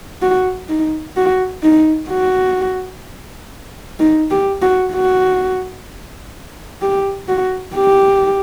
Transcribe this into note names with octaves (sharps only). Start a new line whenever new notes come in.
F#4
D#4
F#4
D#4
F#4
D#4
G4
F#4
F#4
G4
F#4
G4